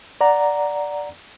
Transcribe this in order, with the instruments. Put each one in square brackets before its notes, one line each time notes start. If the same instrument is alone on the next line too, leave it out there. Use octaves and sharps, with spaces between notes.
[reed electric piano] D5 F#5 A#5